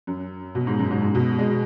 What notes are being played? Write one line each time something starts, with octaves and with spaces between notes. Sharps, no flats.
F#2
B2
G#2
F#2
G#2
G#2
B2
G#3